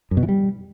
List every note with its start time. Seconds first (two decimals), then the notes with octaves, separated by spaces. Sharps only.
0.11 F#2
0.17 B2
0.23 E3
0.29 G3